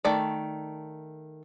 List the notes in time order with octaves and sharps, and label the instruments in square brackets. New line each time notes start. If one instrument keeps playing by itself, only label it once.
[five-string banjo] D#3 A3 D5